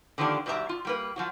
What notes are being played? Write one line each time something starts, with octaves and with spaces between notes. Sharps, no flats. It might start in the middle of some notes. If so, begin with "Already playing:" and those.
D3 D#3 F3 A#3 D4 G4
G#2 B2 G3 D4 E5 A#5
F4
G3 A#3 B4
F3 F#3 F#4